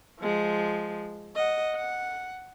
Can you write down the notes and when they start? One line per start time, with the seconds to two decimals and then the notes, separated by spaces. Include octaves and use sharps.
0.20 F3 G#3
1.35 D#5 F#5
1.76 F#5